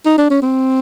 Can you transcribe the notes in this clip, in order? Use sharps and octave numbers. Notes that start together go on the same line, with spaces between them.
D#4
D4
C#4
C4